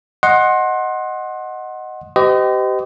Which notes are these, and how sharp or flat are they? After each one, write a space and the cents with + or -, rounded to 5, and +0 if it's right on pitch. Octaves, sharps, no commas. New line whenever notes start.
D#5 +0 F#5 +0 C6 +25
G4 -25 C5 -45 D#5 +0